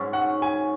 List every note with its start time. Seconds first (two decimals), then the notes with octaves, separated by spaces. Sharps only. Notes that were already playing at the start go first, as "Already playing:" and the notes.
Already playing: G#2 F#3 C#4
0.13 F#5
0.42 G#5